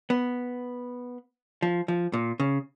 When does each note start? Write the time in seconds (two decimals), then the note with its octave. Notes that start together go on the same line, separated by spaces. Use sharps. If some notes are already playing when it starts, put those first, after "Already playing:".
0.10 B3
1.62 F3
1.88 F3
2.13 A#2
2.40 C#3